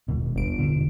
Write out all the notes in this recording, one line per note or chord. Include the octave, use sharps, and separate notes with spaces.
E1 D#2 B2
G1 D7
E2 B2 D3